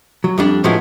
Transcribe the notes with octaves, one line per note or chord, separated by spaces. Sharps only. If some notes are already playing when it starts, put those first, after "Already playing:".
F#3
F2 G3 D4
A2 F3 F#3 G#3 B3 E4